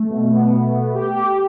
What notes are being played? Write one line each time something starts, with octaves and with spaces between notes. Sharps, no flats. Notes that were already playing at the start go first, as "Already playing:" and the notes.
Already playing: A3
B2
B3
B2
B2
G4
G4